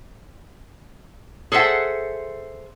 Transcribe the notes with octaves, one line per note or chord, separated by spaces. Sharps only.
G#4 A4 C5 E5 F#5